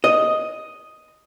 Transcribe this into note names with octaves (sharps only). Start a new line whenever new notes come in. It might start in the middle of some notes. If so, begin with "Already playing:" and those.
D#5